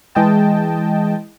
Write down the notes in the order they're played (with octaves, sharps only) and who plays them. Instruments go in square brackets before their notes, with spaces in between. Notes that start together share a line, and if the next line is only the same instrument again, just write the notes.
[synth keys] E3 G#3 D#5 G5 A5